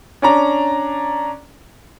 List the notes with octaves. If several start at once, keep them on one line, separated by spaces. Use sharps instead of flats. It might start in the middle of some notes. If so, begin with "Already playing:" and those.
C#4 D4 A#5